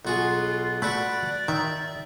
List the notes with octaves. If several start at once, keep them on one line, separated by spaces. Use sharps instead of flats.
B1 F4 F#4 G#4
A3 F#4 B4 D5 B5
D#3 E5